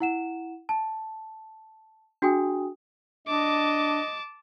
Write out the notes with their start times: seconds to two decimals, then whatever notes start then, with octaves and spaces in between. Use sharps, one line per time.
0.01 E4 F#5 E7
0.69 A5
2.22 D4 F#4 G#4 G5 G#5 D#6
3.27 D4 D#5 A5 D6